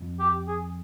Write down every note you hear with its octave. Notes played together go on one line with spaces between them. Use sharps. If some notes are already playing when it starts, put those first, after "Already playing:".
Already playing: F2
G4
G#4